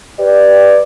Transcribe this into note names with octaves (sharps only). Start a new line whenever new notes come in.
G4 B4 D5